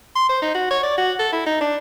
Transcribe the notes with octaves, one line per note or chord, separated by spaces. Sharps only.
C6
C5
D#4
F#4
C#5
D5
F#4
A4
E4
D#4
D4